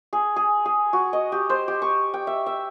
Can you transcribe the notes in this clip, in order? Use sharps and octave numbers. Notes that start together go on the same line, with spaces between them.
G#4
G#4
G#4
F#4
D#5
G4
C5
G4
C#6
G5
E5
E5